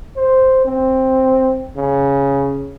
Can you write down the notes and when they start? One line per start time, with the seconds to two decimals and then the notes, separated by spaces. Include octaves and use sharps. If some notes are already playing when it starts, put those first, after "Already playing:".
0.16 C5
0.65 C4
1.76 C#3